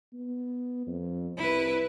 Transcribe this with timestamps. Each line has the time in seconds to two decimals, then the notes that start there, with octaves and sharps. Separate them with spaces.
0.13 B3
0.87 F2
1.37 C2 E4 B4